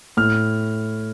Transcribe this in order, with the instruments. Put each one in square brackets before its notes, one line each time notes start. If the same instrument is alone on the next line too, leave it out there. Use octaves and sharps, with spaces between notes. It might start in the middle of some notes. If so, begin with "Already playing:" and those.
[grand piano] A2 F6